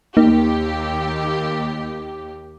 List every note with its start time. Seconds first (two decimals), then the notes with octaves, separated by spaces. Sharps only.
0.17 D#2 A#3 D#4 G4